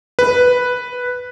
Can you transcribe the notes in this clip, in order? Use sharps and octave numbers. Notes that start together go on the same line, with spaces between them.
B4